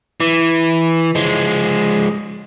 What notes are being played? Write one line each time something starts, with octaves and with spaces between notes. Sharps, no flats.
E3
F3 G#3